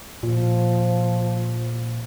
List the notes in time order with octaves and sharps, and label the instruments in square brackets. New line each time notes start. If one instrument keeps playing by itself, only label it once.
[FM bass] A#2 [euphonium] F3